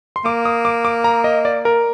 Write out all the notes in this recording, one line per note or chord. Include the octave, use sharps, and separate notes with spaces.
C6
A#3 D6
D#6
D6
D6
A#5
D#5
D5
A#4